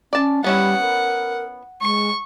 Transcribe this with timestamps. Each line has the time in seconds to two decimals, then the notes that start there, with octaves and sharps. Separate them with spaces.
0.13 C#4 D5 A5
0.44 G3 B3 C#4 E4 F#5
0.82 A#4
1.82 G#3 C#6